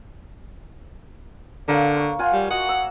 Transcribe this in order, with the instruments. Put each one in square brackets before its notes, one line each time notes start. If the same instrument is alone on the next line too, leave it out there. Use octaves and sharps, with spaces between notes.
[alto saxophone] D3 [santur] A#3 C#5
[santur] C#6
F4 F#5 G#5
[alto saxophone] G3
[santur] F#4 D#5 [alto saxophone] F#5
[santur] E6